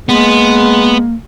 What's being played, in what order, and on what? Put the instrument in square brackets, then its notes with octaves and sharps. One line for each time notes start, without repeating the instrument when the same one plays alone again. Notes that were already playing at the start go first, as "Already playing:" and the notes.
[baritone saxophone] G#3 [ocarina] A#3 [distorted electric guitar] B3